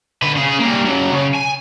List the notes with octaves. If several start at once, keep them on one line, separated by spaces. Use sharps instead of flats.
D3 B4
C#3 G#4
G3 A#3
C#3 F#3
C#3
G#5